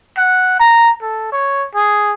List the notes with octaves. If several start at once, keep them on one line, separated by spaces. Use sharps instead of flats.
F#5
A#5
A4
C#5
G#4